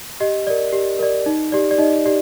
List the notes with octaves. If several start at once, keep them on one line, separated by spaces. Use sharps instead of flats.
G4 D#5
A#4 D5
G4
A#4 D5
D#4
G4 D5
D5
D#4 D#5
G4 D5